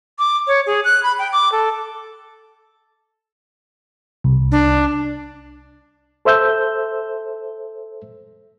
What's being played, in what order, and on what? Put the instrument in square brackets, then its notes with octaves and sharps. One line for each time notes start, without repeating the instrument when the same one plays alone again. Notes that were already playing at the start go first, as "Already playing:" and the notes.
[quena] D6
C#5
G#4
F#6
B5
G5
D6
A4
[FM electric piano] C2
[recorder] D4
[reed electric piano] A4 C5 E5 E6 G6